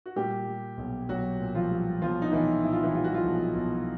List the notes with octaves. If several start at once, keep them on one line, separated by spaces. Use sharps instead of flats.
F#4
A#2 G3 G4
G3
B1
B1 F#3 F#4
A#2
F3 F4
G3
B1 F3 F4
D#4
B1 E3 E4
A#2 E4
F4
E3 E4
G3 F4
F#4
F3 F4
B1
B1